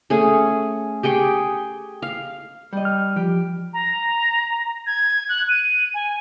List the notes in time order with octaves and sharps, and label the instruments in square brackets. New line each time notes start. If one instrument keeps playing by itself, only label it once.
[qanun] A3 C#4 G#4
G4 G#4 G5 C#6
F5
[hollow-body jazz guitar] G3 D#5
[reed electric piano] F6
[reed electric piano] F3 [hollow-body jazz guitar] G4
[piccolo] A#5
G#6
F#6
D#7
G#5